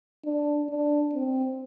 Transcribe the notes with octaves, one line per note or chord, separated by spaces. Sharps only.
D4
D4
C4